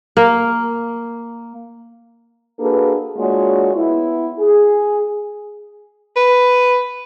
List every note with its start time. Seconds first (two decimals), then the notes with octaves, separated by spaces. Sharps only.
0.17 A#3
2.59 A#3 D4 F#4 G#4 A4 B4
3.18 G#3 A#3 D4 F4 F#4 C#5
3.75 B3 E4
4.39 G#4
6.16 B4